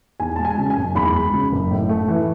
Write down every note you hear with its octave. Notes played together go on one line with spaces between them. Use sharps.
E2 G#5
G#3 A5
G#5
C#3
G#5
F#1
E2 B5
G#3
C#3
F#1
A2
A3
E3